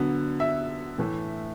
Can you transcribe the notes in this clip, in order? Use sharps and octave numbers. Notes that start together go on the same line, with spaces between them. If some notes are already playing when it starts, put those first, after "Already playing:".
Already playing: D3 F#3 B3
E5
A2 E3 A3